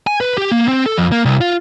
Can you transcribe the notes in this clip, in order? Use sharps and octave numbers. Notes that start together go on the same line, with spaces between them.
G#5
B4
G4
A#3
C4
A4
F2
A#3
C2
F4